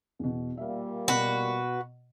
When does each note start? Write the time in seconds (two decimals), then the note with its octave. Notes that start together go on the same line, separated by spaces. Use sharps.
0.19 E2 B2
0.57 A#2 G3 A#3 E5 F5
1.08 B2 F#4 B4